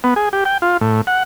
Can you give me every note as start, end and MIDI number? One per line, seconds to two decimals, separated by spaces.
0.04 0.14 59
0.16 0.29 68
0.33 0.44 67
0.45 0.58 79
0.62 0.77 65
0.81 1.01 45
1.07 1.23 78